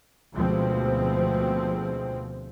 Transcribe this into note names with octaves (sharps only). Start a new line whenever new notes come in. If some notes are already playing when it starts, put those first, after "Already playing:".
D2 B2 F3 G#3 C4